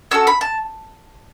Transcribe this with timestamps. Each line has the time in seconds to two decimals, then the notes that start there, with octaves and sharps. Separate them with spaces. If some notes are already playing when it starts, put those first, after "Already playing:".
0.11 C#4 F#4 A4 E6
0.27 B5
0.41 A5